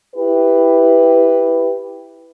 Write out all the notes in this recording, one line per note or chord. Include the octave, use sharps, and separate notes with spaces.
E4 G4 B4